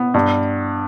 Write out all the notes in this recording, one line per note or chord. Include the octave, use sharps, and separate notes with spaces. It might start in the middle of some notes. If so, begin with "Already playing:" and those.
Already playing: B3
G2